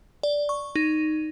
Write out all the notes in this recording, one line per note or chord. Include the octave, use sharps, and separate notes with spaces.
D5
C#6
D#4